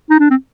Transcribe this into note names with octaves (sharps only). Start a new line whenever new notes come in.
D#4
D4
C4